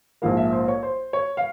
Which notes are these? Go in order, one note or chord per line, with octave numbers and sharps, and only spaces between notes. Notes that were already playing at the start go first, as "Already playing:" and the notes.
A#1 G#2 F3 A#3 F5
E5
C5
C#5
C5
C#5
F5